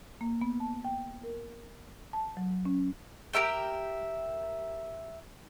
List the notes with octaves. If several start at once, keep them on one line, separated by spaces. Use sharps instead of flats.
A#3
B3
A5
G5
A#4
A5
F#3
C#4
G4 A#4 E5 G5